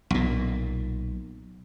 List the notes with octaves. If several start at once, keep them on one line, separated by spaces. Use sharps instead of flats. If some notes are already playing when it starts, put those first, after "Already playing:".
B1 A#2